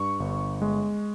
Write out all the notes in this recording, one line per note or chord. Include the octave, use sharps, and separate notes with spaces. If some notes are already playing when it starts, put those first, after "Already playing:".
Already playing: G2 C#6
G1
G#3